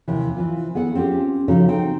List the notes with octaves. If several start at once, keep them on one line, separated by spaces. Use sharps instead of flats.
D#2 C3 E3
E3 C4 F4
B3 G#4 A4 F#5
C4 C#4 F4 G4
C#3 F3 D#4 F#4 G4 A4
C4 D#4 G5